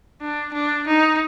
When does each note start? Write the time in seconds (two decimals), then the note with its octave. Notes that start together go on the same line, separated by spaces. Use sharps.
0.22 D4
0.54 D4
0.87 D#4